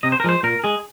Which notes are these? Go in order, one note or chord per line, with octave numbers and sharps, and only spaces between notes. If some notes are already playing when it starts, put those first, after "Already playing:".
C3 D#5
C5
A#4
F3 G#3 C5
A#2 A#4
G#3 G#4